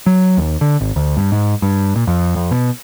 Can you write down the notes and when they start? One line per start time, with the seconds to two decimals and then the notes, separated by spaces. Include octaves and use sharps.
0.06 F#3
0.37 D#2
0.61 D3
0.80 G#1
0.96 D2
1.17 G2
1.32 G#2
1.62 G2
1.96 A#2
2.07 F2
2.36 F2
2.51 B2